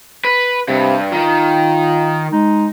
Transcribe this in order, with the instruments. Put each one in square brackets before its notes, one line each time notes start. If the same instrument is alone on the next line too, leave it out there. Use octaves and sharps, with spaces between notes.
[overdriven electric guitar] B4
[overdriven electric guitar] G2 [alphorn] C3
[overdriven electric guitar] D#3 [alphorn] F4
[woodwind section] G#3 D#4